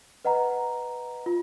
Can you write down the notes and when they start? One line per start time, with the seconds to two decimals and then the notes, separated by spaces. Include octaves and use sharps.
0.25 B4 D#5 F#5 A#5
1.26 F4